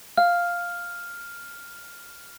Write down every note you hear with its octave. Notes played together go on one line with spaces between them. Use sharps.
F5 F6